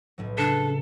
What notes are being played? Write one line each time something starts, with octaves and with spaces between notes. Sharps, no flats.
B1 A2 F#3
C#3 D4 A4